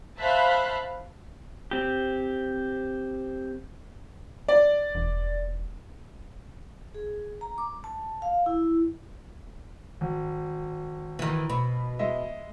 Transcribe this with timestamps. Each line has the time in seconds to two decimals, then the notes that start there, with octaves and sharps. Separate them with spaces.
0.19 C5 E5 F5 A5 B5 F#6
1.71 C4 G4
4.48 D5
4.95 E1
6.95 G#4
7.41 A#5
7.58 D6
7.84 A5
8.22 F5
8.46 E4
10.01 G#1
11.19 D#3 E3
11.50 B2 B5
11.99 G#3 D#5 E5